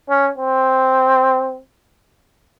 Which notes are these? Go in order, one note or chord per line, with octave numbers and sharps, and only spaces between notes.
C#4
C4